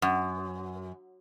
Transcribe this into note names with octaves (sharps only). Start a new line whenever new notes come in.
F#2